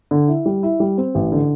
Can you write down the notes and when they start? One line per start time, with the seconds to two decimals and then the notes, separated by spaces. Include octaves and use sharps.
0.11 D3
0.28 E4
0.46 G3
0.63 E4
0.80 G3
0.98 C4
1.15 A1
1.32 D3